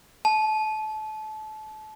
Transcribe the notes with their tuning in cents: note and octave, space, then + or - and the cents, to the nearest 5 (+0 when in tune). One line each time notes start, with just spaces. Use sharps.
A5 -30